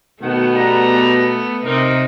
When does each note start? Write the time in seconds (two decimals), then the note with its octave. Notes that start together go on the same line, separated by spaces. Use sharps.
0.22 B2 D#3 A3 B3 F#5
0.55 G3 F#5 A#5
1.66 C3 D#4 A#4